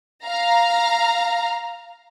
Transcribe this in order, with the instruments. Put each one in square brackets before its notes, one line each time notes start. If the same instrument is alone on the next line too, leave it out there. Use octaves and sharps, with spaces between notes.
[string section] F5 A#5